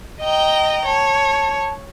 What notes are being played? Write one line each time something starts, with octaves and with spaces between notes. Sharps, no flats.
D#5 G5 A#5
C#5 A5